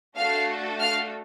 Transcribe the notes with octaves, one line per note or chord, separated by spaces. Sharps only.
A3 D4 F#4 A4 F5 F6
F5 F6